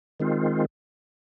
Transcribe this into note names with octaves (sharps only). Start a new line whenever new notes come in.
D#3 G#3 C4 F4